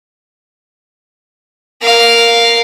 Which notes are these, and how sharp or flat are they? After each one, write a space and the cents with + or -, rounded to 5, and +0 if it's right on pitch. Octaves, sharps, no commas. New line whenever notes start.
A#4 +0 F5 +0